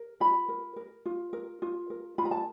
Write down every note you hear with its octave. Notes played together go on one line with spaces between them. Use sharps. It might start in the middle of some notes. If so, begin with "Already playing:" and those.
Already playing: A#4
F4 B5
A#4
A#4
F4
A#4
F4
A#4
F4 B5
A#5
A5